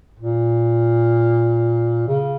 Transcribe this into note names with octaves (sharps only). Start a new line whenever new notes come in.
A#2
C#3